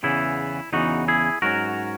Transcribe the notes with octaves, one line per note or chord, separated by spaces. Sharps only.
E2 C#3 E3 B3 E4
E2 C#3 E3 B3 D#4 F#4
E4 G#4
G#2 F#3 C#4 F#4 A#4